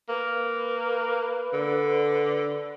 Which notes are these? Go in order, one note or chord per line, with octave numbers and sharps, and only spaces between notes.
A#3 B4
D3